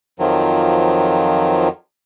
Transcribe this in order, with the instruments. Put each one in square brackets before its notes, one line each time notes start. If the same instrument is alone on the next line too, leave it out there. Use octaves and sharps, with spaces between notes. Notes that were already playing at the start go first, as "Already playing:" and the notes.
[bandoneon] F2 D#3 F3 F#3